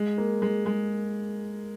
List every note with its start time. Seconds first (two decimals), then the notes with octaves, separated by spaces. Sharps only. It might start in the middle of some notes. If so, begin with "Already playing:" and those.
Already playing: G#3
0.18 A#3
0.42 G#3
0.66 G#3